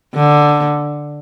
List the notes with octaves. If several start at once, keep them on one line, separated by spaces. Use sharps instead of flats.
D3